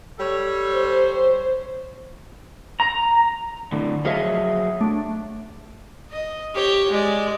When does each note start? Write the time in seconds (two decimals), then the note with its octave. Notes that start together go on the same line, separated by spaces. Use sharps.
0.19 G3 A4 C#5
0.72 C5
2.80 A#5
3.72 A2 D3
4.05 F3 F#3 G#4 C#5 D#5 E5
4.81 A3 D4
6.11 D#5
6.55 G4 C#5
6.91 G#3 D5